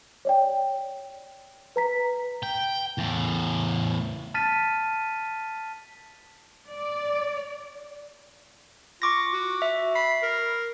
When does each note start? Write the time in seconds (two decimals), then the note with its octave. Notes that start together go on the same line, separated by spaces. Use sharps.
0.25 C#5 D5 G5
1.76 B4 A#5 B6
2.43 G5
2.98 E2 A2
4.34 A5 F6 A6 B6 D#7
6.68 D5
9.02 F4 C#6 D6 A#6
9.33 F#4
9.62 E5
9.95 B5 C7
10.22 A#4